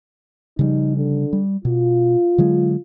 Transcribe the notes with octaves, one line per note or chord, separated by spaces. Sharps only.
C#3 F3 G3 D#4
D3
G3
B2 F4
D3 F#3 G#3